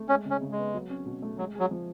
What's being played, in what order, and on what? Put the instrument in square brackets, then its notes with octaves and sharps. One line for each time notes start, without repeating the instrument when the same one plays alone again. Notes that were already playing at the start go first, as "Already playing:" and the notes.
Already playing: [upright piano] A3
[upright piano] G#3 [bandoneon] C#4
[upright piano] C#3
[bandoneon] C#4
[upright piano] C#3
[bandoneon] G#3
[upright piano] B3
F#3
C#4
B2
A3
[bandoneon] F#3 [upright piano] G#3
[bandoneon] F#3 [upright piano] G#4
[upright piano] F3